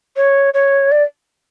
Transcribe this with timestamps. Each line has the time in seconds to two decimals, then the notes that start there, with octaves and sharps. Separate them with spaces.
0.16 C#5
0.54 C#5
0.92 D5